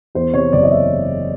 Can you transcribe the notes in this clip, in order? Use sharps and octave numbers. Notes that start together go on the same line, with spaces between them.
E2 C5
C3 C#5
F#1 D5
D#5
E5